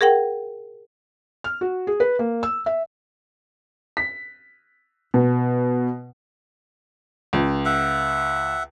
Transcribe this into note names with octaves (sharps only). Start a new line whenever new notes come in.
G#4 A#4 F#5 G5
F6
F#4
G#4
B4
A#3
E6
E5
B6
B2
C#2
E5 F#5